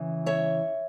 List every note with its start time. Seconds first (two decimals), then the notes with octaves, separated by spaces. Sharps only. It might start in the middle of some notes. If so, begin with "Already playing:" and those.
Already playing: C#3 E3
0.26 C#5 E5